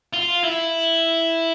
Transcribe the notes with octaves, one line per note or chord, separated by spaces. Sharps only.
F4
E4